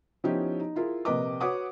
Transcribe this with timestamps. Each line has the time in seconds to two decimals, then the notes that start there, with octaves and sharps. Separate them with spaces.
0.24 F3 B3 C#4 D#4 E4 G4
0.59 D#4
0.76 E4 F4 G#4 A#4
1.05 A#1 C3 A#4 B4 D#5 D6
1.40 F#4 B4 C#5 F#5 D6 D#6